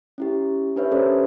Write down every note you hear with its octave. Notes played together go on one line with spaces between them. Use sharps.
C#4 E4 G4
D4 G4 B4 C#5 E5
C#4 G4 A4 A#4 C5 D5